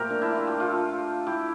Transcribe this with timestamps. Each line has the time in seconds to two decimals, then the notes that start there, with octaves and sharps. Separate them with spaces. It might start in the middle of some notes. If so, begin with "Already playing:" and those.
Already playing: A#2 F3 A3 A#3 G4 A#4
0.10 D4
0.22 E4
0.35 F4
0.47 G4
0.60 F4 A4
1.26 E4 G4